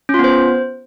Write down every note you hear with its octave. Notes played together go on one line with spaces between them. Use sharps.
C#4
F4
B3
C5